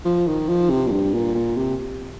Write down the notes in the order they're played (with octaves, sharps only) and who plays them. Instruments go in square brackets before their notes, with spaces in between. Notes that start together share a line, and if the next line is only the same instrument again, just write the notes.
[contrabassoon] F3
D#3
F3
C3
A#2
G2
A#2
A#2
C3